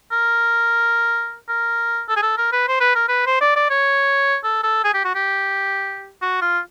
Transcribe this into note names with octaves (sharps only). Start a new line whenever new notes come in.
A#4
A#4
A4
G#4
A4
A#4
B4
C5
B4
A#4
B4
C5
D5
D5
C#5
A4
A4
G#4
G4
F#4
G4
F#4
F4